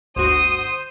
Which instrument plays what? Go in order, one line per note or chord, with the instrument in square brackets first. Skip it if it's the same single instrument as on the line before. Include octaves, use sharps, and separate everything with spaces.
[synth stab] G1 D2 F#4 [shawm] C5 [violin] D#6